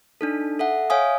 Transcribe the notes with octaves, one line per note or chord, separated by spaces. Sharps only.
D4 D#4 A4
A4 E5 F#5
C#5 E5 F5 G#5 D#6